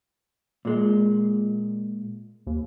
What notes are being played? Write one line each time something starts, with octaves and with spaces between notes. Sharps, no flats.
A#2 G#3
D#2